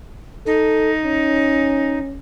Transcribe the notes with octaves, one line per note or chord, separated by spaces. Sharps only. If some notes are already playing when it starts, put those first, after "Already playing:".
D#4 A4
C#4